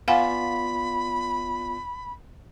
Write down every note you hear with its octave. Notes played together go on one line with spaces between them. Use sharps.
B3 F4 D5 F5 F#5 G#5 B5